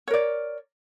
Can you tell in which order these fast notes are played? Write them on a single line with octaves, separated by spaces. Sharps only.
C#5 A#4 D5